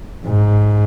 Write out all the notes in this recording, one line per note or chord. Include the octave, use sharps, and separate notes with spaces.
G#2